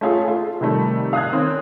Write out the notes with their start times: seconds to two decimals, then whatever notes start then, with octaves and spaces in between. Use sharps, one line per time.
0.01 A3 C#4 F4 G#4
0.24 F4 A4
0.61 C3 D#3 G3 A3
1.13 F5 D#6 F#6 G#6
1.32 D#3 C4 C#4